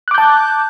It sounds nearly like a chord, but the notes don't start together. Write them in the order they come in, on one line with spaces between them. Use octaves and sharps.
F#6 D6 G6 A5